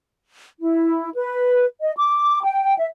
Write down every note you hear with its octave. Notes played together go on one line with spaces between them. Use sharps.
E4
B4
D#5
D6
G5
E5